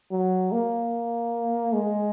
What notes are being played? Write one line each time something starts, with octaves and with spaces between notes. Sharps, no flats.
F#3
A#3
G#3